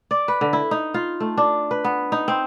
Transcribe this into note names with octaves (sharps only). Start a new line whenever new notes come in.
D5
B4
D3
E4
D#4
F4
A3
D4
B4
B3
D#4
C4